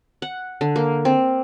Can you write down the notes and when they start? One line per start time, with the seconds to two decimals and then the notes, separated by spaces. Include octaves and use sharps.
0.22 F#5
0.61 D3
0.76 A#3
1.05 C4